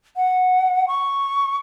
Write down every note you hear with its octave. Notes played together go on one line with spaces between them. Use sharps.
F#5
C#6